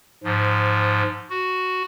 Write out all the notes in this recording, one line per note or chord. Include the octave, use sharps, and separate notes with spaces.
G#2 F3
F#4